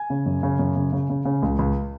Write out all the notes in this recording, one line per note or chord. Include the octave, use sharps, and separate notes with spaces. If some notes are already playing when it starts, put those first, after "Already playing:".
Already playing: G#5
C#3
F#2
C#3
F#2
C#3
C#3
C#3
C#3
C#2
C#2